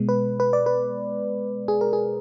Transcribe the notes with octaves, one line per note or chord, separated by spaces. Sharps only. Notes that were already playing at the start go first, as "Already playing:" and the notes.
Already playing: B2 G#3 B3
B4
B4
D5
B4
G#4
A#4
G#4